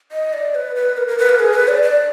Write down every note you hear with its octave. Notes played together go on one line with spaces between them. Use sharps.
D#5
D5
B4
B4
A#4
A#4
B4
A#4
G#4
B4
D5
D5